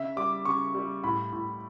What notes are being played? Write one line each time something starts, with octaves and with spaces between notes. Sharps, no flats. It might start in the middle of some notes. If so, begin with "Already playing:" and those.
Already playing: C#3 E5
G3 D6
C#3 C#6
G3
A2 B5
A2